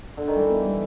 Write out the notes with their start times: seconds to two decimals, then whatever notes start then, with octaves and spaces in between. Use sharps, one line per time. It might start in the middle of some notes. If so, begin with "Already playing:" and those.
0.17 D3
0.28 D#3
0.36 E3 G3
0.51 B3
0.66 G3